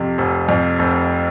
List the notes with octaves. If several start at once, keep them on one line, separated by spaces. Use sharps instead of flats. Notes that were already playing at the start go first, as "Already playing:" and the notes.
Already playing: F2 C3
F1
F2
F1